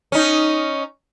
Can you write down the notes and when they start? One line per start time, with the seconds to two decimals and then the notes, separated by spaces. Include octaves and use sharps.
0.12 C#4 D#4